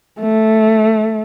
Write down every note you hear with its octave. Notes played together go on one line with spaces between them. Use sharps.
A3